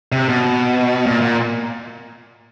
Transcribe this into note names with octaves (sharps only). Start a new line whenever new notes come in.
C3
B2
A#2
A#2